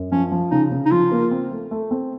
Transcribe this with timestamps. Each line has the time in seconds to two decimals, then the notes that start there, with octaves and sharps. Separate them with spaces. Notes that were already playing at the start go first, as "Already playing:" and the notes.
Already playing: F#2
0.12 F3 C#4
0.32 F3
0.51 C#3 D#4
0.72 C#3
0.86 D#4
0.91 F3 F4
1.12 A#3
1.31 C4
1.51 A3
1.71 A3
1.91 C4